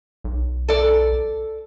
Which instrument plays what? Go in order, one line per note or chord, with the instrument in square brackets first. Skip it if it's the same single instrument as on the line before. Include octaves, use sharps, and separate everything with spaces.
[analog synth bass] B1
[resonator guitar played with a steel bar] A4 D5